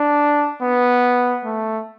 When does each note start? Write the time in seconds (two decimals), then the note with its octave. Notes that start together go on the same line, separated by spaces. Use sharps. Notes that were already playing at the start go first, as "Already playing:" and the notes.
Already playing: D4
0.61 B3
1.45 A3